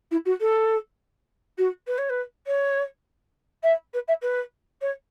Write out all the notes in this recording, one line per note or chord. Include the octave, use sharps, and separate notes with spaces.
E4
F#4
A4
F#4
B4
C#5
B4
C#5
E5
B4
E5
B4
C#5